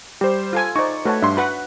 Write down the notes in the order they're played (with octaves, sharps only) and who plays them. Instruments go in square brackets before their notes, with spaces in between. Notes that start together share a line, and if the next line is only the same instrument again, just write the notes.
[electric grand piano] G3 C5 [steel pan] G4
[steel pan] F4 A4 G#5
[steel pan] D#4 D5 [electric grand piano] C5 C#6
[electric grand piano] A3 A5 [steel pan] F#4 B4 C#5
[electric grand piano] G2 C6 [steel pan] D4 E5
[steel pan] F#4 B4 F#5 [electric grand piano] B5